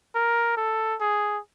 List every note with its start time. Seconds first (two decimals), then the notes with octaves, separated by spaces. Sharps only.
0.15 A#4
0.57 A4
1.00 G#4